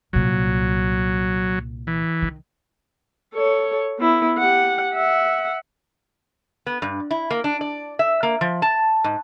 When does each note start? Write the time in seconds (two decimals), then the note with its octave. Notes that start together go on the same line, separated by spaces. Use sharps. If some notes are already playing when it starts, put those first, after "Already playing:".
0.13 C2 A#2 F#3
1.87 E3
2.22 D#3
3.34 A4 C#5
3.99 B3 E4
4.38 G4 F#5
4.94 E5 F#5
6.66 B3
6.82 G2
7.11 E4
7.31 A#3
7.44 D4
7.61 D5
7.99 E5
8.23 A#3
8.41 F3
8.62 A5
9.04 G#2